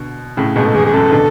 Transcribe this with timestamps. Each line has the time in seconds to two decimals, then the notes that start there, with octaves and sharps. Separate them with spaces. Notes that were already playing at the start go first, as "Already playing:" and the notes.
Already playing: B2 D3
0.37 A2 C#3
0.56 G#2 B2 G#4
0.66 A4
0.74 E2 G#4
0.86 G#4
0.93 F#2 A4
1.12 B2 D3